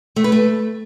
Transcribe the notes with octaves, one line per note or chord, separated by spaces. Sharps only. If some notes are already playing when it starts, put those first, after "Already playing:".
A3
B4
A3